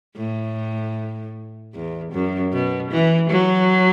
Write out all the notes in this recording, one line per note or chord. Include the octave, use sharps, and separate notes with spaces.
A2
E2
F#2
B2
E3
F#3